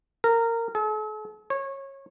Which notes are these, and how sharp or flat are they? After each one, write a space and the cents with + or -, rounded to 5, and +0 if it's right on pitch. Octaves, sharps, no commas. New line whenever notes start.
A#4 -20
A4 -45
C#5 -20